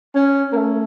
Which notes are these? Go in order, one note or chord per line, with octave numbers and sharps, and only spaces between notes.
C#4
A#3
A3